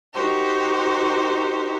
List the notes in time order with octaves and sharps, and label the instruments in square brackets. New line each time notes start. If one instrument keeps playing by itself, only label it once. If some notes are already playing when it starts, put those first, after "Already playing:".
[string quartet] D#4 F#4 G4 A#4 C5